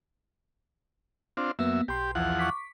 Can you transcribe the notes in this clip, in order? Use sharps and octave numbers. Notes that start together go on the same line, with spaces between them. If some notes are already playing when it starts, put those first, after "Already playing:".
C4 D4 F4
F#2 A#3 B3 E5
B1 G4 C6
E2 F3 F#5
C#6 D6 B6